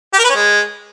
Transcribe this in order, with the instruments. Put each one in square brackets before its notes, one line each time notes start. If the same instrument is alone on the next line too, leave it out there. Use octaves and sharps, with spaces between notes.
[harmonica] G4
A#4
B4
C#4
G#3